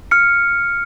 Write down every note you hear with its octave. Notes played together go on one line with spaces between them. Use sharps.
F6 C#7